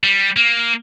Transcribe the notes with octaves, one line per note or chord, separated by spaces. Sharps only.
G3
A#3